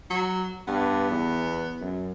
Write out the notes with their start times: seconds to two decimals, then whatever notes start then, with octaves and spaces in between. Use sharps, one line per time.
0.10 F#3
0.68 G2 B3
1.11 E2
1.81 F#2